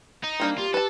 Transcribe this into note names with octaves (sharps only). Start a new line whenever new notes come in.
D#4
G3 A#3 C4 D4
F4 G4
A4 B4 A5